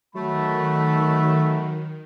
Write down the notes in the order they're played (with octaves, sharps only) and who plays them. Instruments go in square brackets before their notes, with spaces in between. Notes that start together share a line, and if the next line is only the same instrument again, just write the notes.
[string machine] D#3 [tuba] F#3 [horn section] A3 [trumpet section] F#4 B5